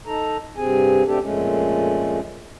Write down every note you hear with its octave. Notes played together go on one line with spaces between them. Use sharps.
D#4 A4 A#5
G2 C3 C4 G#4 G#5
B2 A3 C4 D4 G4 A4
F2 A#2 G#3 A3 C#4